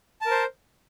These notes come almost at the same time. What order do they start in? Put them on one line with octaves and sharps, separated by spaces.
A5 A#4 C5